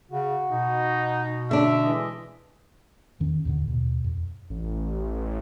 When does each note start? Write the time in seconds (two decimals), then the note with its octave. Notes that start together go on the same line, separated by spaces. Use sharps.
0.11 C#3 F#4
0.52 B2 D#4
1.51 D3 D4 E5
1.83 E3 G#3 D#5
3.20 E2 D#3 C#4
3.45 D#2 A2 D3
3.68 D#2 B2
4.04 F2
4.50 A1